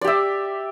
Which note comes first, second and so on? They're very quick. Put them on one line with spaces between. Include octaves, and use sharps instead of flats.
D5 G4 E5